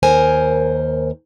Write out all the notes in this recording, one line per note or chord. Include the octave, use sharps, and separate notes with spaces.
D#2 A#4 C5 G#5